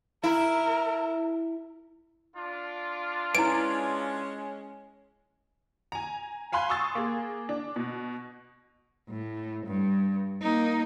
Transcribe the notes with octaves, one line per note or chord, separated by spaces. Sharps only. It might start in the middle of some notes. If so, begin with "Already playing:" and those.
E4 A#4
D4 F4
G#3 C#4 E4 B4 D7
G#5 A#5
F5 G#5 B5 C6 F#6
C6 C#6 D#6 E6 A6
A#3 G#4
D4
B2
A2
G2
A#3 D#4